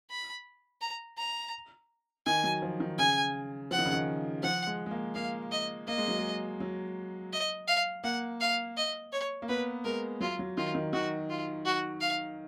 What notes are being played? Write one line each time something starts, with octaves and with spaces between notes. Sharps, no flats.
B5
A#5
A#5
D#3 G#5
F#3
F3
D#3
C#3 G#5
F3 F#5
D#3
C#3
D#3
F3 F#5
G#3
G#3
A#3
A#3 F5
D#5
A#3 D#5
G#3
F#3
G#3
F#3
D#5
F5
A#3 F#5
F5
D#5
C#5
A#3
B3 B4
G#3 A#4
F#3 F4
F#3
D#3 F4
D#3
D#3 F#4
F4
F#4
F5